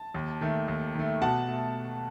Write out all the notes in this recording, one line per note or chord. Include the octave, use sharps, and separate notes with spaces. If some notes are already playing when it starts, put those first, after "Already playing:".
Already playing: A5
D#2
D#3 A3
D#2
D#3 A3
B2 F#5 A5
A3